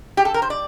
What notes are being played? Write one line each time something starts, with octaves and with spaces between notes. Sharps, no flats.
G4
A4
A#4
C5
D5